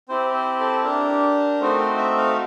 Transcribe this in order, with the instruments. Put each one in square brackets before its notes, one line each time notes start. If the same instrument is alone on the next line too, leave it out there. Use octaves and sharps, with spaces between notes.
[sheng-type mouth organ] C4 E4 G4 C5
C5
A4
D4 G4 A#4
A3 C4 D#4 F#4 C5
C5
E5
F5